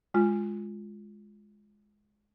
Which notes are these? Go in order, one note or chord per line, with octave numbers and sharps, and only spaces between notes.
G#3 F4